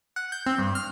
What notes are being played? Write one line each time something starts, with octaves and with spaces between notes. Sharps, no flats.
F#5
G6
C4
G2
F6